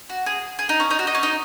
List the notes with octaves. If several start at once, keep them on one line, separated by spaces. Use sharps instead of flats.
F#4
G#4
G#4
D#4
C#4
D#4
F#4
D#4
C#4
D#4